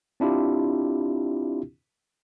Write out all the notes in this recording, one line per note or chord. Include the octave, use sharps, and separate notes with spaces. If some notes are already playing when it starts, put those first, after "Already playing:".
C4 D4 E4 F4 G4